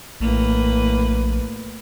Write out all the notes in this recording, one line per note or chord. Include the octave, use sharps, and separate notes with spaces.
A#1 A2 A#3 B4